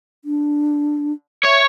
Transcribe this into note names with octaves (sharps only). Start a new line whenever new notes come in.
D4
C#5 E5